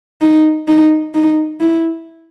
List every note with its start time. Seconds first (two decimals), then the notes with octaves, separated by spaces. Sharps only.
0.21 D#4
0.68 D#4
1.14 D#4
1.60 E4